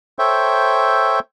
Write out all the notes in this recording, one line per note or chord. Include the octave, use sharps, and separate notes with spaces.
A4 C5 C#5 E5 G5